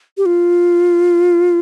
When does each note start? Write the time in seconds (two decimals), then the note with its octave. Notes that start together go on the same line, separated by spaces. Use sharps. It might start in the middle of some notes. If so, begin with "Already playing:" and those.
0.18 G4
0.26 F4